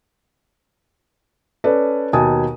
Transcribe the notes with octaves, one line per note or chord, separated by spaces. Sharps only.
C#4 A4 B4 D5
D#2 B2 G#5 A5 D#6